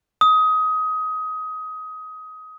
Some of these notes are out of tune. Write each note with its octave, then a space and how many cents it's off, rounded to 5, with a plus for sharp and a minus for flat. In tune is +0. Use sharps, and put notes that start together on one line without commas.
D#6 +20